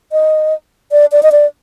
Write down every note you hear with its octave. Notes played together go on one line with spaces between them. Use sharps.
D#5
D5
D5
D#5
D5